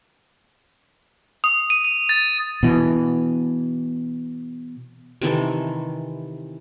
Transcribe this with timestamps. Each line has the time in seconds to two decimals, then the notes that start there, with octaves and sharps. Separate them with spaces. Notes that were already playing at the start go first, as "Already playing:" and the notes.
1.44 D#6
1.70 D#7
1.85 D#7
2.09 A6
2.63 B2 E3
5.22 C3 D#3 E3 A4